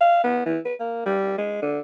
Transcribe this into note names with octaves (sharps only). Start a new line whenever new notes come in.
F5
B3
E3
B4
A#3
G3
G#3
D3